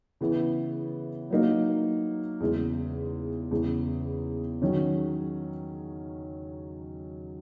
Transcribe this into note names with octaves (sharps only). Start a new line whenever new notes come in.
C#3 E3 B3 E4
F#3 A#3 D#4
E2 C#3 G#3
E2 C#3 G#3
D#3 F#3 C#4